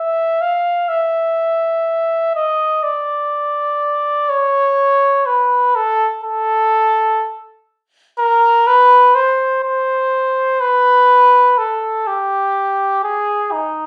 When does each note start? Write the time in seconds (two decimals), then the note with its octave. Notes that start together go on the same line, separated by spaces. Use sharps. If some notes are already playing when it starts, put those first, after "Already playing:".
Already playing: E5
0.41 F5
0.89 E5
2.35 D#5
2.83 D5
4.29 C#5
5.26 B4
5.75 A4
6.24 A4
8.18 A#4
8.67 B4
9.15 C5
9.63 C5
10.61 B4
11.58 A4
12.07 G4
13.04 G#4
13.52 D#4